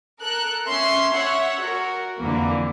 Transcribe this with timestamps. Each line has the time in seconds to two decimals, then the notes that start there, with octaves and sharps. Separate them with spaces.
0.20 A4 A#4 F#6
0.67 C#4 E5 C6
1.13 C#5 E5 F#5
1.61 F#4 A#4
2.19 F2 D3 E3 A#3